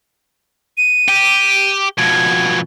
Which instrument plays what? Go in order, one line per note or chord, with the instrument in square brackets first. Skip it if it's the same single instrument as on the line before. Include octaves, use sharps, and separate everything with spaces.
[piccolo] D#7
[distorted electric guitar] G4
[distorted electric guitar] F2 B2 [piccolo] G#6